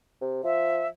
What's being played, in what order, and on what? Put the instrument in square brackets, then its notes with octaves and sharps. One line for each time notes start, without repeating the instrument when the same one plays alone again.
[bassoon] C3
[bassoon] F3 [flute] E5